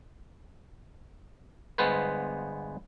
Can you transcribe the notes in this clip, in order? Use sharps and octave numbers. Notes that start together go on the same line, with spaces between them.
G1 G#3 B3 B4 C5